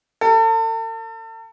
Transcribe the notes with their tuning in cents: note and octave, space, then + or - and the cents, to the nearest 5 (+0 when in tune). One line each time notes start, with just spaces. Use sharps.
A4 +40